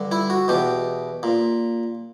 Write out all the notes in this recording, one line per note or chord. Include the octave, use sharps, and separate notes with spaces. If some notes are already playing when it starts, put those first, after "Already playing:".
Already playing: G2 D3
E4
F#4
E2 B2 G4
A#2